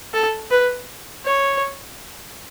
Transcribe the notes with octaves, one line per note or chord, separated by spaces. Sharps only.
A4
B4
C#5